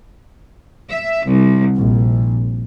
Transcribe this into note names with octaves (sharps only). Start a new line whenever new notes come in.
E5
C2
A#1